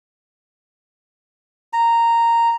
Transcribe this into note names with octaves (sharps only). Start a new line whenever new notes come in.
A#5